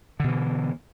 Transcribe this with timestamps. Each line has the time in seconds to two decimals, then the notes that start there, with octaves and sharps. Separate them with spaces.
0.20 D3
0.24 B2
0.28 E3